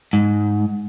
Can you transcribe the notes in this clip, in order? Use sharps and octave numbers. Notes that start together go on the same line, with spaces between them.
G#2